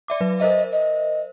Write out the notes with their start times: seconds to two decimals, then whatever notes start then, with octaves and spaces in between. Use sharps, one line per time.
0.08 D5 E5 D6
0.20 F#3 B4
0.40 A#4 C5 D#5 E5
0.72 D#5